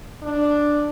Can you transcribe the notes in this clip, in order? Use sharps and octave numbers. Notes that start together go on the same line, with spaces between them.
D4